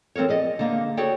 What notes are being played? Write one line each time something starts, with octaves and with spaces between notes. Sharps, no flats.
F3 C4 A4 A#4 C#5
G#4 D5 D#5
D3 A#3 B3
F#4 G#4 A4 C#5 D5 G5